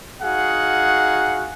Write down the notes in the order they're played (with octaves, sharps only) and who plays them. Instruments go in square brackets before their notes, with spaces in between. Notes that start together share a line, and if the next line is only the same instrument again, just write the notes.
[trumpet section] D#4 F#4 G#4 F5 F#5